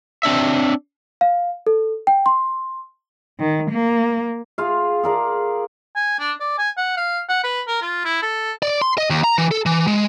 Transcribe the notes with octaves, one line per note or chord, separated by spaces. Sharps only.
C4 D4 E5
F5
A4
G5
C6
D#3
A#3
F4 G#4 F5
G#4 A#4 D5
G#5
D4
D5
G#5
F#5
F5
F#5
B4
A#4
F4
E4
A4
D5
C6
D#5
D#2
A#5
E3
A4
E3
G#3